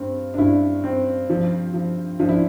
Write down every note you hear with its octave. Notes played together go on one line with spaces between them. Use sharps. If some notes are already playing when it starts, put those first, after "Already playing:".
Already playing: G2 C4
D4
G2 E4
C4
F3
F3
F3 D4
E4